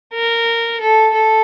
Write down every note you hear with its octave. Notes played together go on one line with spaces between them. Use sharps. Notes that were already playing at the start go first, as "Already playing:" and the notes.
A#4
A4
A4